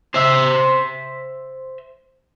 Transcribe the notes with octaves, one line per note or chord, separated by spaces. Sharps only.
C5 E5